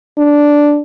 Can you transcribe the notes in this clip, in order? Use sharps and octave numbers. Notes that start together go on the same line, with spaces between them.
D4